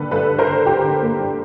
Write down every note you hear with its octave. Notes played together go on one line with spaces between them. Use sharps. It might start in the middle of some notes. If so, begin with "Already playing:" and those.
Already playing: D3 G3 A#3 A4 B4
G3 A4 B4
D3
A#4 C5
D3
D3 G4 A4
D3
A#3
G3